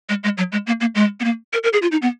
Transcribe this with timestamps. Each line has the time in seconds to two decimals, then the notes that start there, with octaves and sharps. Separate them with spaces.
0.09 G#3
0.24 G#3
0.38 F#3
0.52 G#3
0.67 A#3
0.81 A#3
0.95 G#3
1.20 B3
1.24 A#3
1.53 A#4
1.63 A#4
1.73 G#4
1.82 F4
1.92 D#4
2.02 B3